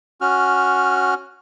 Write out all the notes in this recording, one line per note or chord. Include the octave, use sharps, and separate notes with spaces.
C#4 F#4 F6